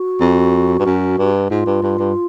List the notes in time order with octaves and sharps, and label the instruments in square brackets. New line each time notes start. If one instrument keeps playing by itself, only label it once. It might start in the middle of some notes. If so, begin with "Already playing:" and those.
Already playing: [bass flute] F#4
[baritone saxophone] F2
G2
F#2
G2
[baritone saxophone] G#2 [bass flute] F4
[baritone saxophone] G2
G2
G2